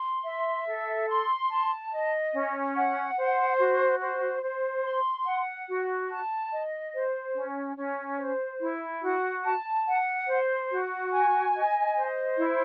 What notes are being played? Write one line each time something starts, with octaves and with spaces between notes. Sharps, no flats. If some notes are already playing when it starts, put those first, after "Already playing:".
Already playing: C6
E5
A4
C6
A5
D#5
C#4
F#5
C5
F#4
C5
C5
C6
F#5
F#4
A5
D#5
C5
C#4
C#4
C5
E4
F#4
A5
F#5
C5
F#4
G#5
D#5
C5
E4